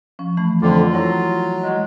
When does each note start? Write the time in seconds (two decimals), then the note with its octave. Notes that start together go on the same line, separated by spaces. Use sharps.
0.19 F3 C#4
0.37 E3 A3 B5
0.62 F2 D3 F4 D6
0.93 F#3 E4 A#5 A#6
1.62 G#3